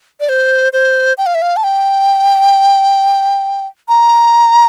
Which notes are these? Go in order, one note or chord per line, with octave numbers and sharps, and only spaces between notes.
D5
C5
C5
G5
F5
E5
F5
A5
G5
A#5